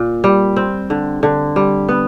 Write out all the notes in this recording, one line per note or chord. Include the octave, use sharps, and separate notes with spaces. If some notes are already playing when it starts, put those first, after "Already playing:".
Already playing: A#2
G3
C4
D3
D3
G3
B3